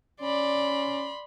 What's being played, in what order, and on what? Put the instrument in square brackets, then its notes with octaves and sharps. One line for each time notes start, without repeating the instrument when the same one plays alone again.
[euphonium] C#4 [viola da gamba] D5 [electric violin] B5 C6